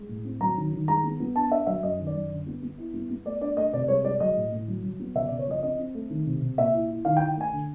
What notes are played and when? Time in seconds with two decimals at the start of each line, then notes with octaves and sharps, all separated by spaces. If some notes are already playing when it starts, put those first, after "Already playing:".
Already playing: G#3
0.09 A2
0.25 C4
0.41 F#3 A#5
0.57 D#3
0.72 D#3
0.88 G#3 A#5
1.03 B3
1.20 B3
1.36 D4 A5
1.51 D4 E5
1.67 F#3 E5
1.83 F#2 D#5
1.99 D#3
2.07 D5
2.14 F#2
2.30 D3
2.47 B3
2.62 B3
2.78 E4
2.94 B3
3.10 B3
3.25 A3 D5
3.41 D4 D5
3.57 A3 D#5
3.73 C3 D5
3.88 G#3 C#5
4.04 G#3 D5
4.20 F#3 D#5
4.36 A2
4.52 A2
4.68 F#3
4.83 F#3
5.00 B3
5.15 C#3 E5
5.27 D5
5.31 C#3
5.39 C#5
5.47 F3 D#5
5.63 C4 D#5
5.79 C4
5.95 A3
6.10 D#3
6.26 C3
6.42 C3
6.58 A#2 E5
6.73 E4
6.89 E4
7.05 D#3 F5
7.17 G5
7.21 D#3
7.28 G5
7.37 A3 G#5
7.53 D3